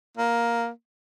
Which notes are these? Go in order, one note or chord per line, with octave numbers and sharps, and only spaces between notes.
A#3